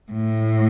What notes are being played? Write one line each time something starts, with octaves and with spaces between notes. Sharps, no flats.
A2